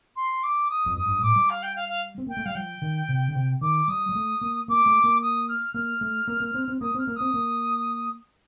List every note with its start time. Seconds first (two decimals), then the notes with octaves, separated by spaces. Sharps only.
0.16 C6
0.43 D6
0.69 D#6
0.86 F2
0.96 G2 D#6
1.08 G2
1.22 A2 D6
1.36 G3
1.49 F5
1.62 G5
1.76 F5
1.88 F5
2.18 C4
2.26 A#3 G5
2.37 A3
2.45 G3 F5
2.55 F3 G5
2.82 D#3
3.09 C3
3.28 D3
3.35 C3
3.61 D#3 D6
3.88 G3 D#6
4.09 G3
4.15 A3
4.41 A#3
4.68 A#3 D6
4.86 A3
5.04 A#3
5.21 D#6
5.48 F6
5.74 A#3 F6
6.01 A3
6.28 A#3
6.40 A#3
6.54 C4
6.68 C4
6.81 A#3 D#6
6.94 C4 F6
7.07 A#3
7.16 C4 D#6
7.34 A#3